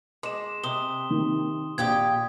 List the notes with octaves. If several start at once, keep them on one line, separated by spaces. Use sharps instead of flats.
G#3 C6 D6 E7
C3 C6 D#6 G7
D#3
A#1 A#2 G4 G5 D#6 G#6